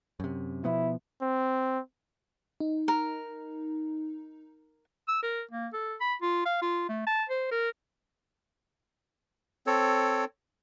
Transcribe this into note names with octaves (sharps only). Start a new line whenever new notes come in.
F#2 C3
B2 F3 B3 E4
C4
D#4
A#4
E6
A#4
A#3
A4
B5
F4
F5
F4
A3
A5
C5
A#4
C4 A4 C#5